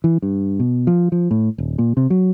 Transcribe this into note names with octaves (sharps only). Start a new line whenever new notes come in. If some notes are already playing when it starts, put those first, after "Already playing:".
E3
G2
B2
F3
F3
A2
D#1
A#2
C3
F#3